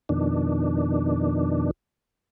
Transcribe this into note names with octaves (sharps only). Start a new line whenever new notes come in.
F2 B2 D#3 D4